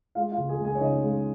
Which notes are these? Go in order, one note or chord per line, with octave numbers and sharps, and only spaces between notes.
G#3 F4 F5
F4 F5
C#2
G#4 G#5
C#2
G#4 G#5
C#5
C#3 D#4 D#5
G#3